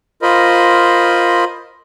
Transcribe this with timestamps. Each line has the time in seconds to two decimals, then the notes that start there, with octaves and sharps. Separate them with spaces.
0.22 F4 A#4 C5 D#5 B5